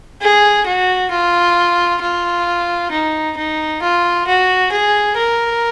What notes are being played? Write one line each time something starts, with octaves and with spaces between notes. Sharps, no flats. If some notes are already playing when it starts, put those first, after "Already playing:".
G#4
F#4
F4
F4
D#4
D#4
F4
F#4
G#4
A#4